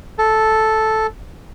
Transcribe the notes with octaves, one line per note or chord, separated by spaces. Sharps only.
A4